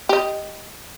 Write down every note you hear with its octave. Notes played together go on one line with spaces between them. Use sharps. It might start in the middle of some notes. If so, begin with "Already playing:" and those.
G4 D#5